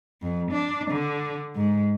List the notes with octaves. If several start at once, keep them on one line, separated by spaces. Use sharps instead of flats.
F2
D4
D3
G#2